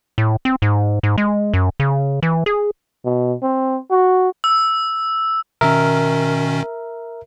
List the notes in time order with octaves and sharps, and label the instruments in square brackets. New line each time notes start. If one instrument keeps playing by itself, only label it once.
[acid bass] A2
C4
G#2
G#2
G#3
F#2
C#3
E3
G#4
[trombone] B2
C4
F#4
[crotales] E6
[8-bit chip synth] B2 D#3 C#4 [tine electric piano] A#4 E5